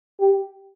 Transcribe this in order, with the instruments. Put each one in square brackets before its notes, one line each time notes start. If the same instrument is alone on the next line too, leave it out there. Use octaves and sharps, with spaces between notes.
[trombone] G4